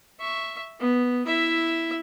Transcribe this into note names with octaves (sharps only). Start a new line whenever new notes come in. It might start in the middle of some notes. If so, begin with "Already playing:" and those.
E5 C#6
B3
E4 E5